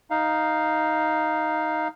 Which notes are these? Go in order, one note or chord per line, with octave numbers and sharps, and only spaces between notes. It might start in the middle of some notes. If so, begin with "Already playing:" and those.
D#4 F5